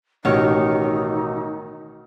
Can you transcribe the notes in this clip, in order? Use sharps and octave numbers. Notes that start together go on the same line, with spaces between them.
A1 B2 D#3 D#4 C#5